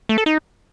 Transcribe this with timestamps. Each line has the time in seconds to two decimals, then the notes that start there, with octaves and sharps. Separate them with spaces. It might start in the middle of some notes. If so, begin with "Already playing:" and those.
0.09 A3
0.18 A4
0.26 D#4